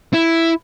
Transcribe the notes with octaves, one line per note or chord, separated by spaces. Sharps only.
E4